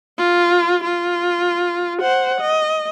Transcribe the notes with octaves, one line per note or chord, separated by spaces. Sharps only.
F4
F4
C5 F#5
D#5